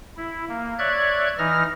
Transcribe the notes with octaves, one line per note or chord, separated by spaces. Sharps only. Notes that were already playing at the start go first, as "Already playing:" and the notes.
E4
A#3
C#5 D5 E5 F#6 G#6
E3 D#4 F6 A#6